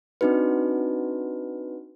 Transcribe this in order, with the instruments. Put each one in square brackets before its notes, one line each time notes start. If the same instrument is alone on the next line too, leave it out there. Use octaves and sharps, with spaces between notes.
[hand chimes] C4 D4 D#4 F#4 B4